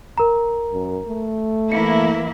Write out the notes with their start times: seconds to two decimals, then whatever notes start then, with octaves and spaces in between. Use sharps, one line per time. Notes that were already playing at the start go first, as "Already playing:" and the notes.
0.18 A#4 A#5
0.72 F#2
1.08 A3
1.72 E3 A#3 E4 C#7